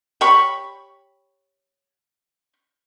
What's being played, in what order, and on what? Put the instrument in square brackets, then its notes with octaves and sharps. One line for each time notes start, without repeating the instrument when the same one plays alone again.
[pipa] G4 C#5 B5 C#6